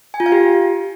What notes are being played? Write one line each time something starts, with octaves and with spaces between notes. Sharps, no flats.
G#5
F4
F5
G4